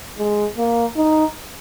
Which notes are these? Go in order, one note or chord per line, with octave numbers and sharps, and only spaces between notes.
G#3
A#3
D#4